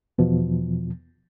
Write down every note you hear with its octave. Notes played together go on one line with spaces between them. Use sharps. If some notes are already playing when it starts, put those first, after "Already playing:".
E2 B2 F3